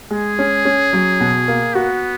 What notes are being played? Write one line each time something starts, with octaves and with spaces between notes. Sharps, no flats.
G#3 G#4
C#4
C#4
F#3
B2
A#3
B3 F#4